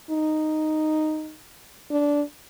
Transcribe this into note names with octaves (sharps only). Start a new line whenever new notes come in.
D#4
D4